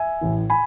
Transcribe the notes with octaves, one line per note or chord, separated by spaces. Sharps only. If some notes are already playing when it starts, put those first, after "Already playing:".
Already playing: E5 G#5
A1 A2 E3
G#5 B5